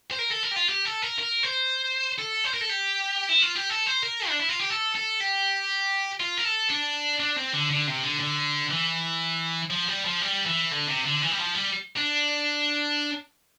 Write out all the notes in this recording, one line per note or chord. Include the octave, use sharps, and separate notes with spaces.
C5
A#4
A4
A#4
G4
F4
G4
A4
A#4
A#4
C5
A4
C5
A#4
A4
G4
E4
F4
G4
A4
C5
A#4
D4
E4
F4
G4
A4
A4
G4
F4
A#4
A4
D4
D4
C4
D3
D3
C3
D3
D3
E3
F3
G3
F3
G3
E3
D3
C3
D3
E3
G3
F3
G3
D4